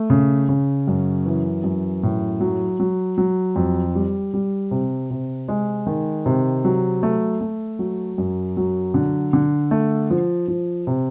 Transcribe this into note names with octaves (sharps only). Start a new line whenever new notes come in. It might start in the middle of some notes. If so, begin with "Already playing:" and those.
Already playing: A3
C#3
C#3
F#2
E3
F#2
A2
F#3
F#3
F#3
F2
G3
G3
C3
C3
G#3
D#3
C3
F#3
A3
A3
F#3
F#2
F#3
D3
D3
A3
F3
F3
C3